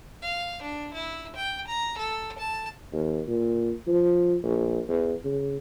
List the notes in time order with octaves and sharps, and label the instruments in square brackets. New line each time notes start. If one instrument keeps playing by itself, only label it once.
[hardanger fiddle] F5
D4
E4
G5
A#5
A4
A5
[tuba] D#2
A#2
F3
A#1
E2
C#3